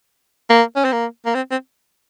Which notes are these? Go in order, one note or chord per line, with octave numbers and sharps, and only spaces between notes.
A#3
C#4
C4
A#3
A#3
C4
C4